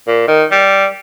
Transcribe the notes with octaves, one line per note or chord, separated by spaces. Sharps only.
A#2
D#3
G3